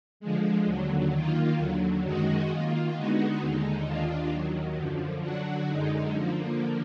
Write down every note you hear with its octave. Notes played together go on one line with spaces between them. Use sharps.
D3 F3 G#3
D#2 D3 F#3
D#3 A#3 F4
D#2 D3 F#3
F#2 D#3 G#3 D#4 F#4
D#3 A#3 F4
D3 G#3 B3 D#4 F#4
D#2 D3 G#3 D#4
D#2 D#3 A#3 D4 F4
D#2 D#3 F#3
F#2 D3 F3
D3 F#3 D4 F#4
F#2 D3 G#3 D#4
D3 F3 A#3